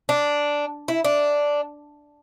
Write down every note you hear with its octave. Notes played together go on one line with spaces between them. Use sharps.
D4
E4
D4